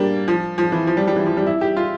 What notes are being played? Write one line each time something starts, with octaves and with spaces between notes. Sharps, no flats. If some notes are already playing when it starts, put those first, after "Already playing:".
Already playing: G3 A#3 D4
F3
F3
E3
F3
G3
G3
E3
F3
G3
E4
G4
F4